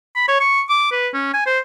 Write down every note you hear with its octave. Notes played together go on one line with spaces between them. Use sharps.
B5
C#5
C#6
D6
B4
C#4
G#5
C5